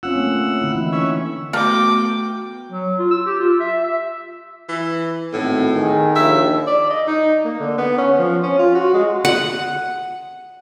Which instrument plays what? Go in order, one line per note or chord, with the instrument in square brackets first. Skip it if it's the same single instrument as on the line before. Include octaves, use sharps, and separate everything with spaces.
[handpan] C4 C#4 F4 [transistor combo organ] F#5 E6
[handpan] A3 A#3
D3 E4
E3 D#4
[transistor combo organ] C#4 E5
[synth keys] A3 B3 F#4 [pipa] A4 F5 A#5 [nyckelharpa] G5 D6
[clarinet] F#3
F4
E6
G4
F4
E5
E5
[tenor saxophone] E3
[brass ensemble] G#1 B3 [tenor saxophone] A2
[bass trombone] D#3 [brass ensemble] G#4
[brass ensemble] A#1 D#2 [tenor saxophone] E5
[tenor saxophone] D5
D#5
D#4
A#3
D3
B3
C#4
F3
C#4
F4
F#4
G#3
[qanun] F#5